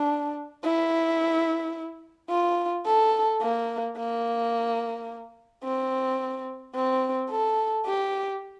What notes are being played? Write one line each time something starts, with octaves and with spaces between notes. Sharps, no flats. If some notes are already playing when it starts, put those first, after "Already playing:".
Already playing: D4
E4
F4
A4
A#3
A#3
C4
C4
A4
G4